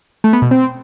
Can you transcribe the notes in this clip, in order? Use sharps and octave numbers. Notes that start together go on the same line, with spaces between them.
A3
B3
B2
C4